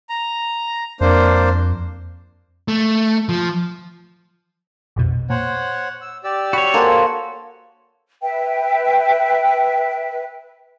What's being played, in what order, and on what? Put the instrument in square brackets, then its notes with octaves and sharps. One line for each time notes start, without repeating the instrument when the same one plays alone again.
[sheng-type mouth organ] A#5
[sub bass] F2 [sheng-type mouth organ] A#3 D4 C5
[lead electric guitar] A3
F3
[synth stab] A#1 F2 B2
[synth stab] A#2 [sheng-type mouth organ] C5 C#5 F#5
[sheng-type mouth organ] E6
G4 D5 E6
[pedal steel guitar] F#4 C#5 [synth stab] B5
[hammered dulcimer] A#3 A4 C5 [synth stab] F#5 G#5
[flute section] B4 E5 G5